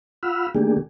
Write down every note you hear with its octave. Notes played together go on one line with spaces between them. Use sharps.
F4 F#5 B5 E6 F6
D#3 A3 A#3 D4 G4 G#4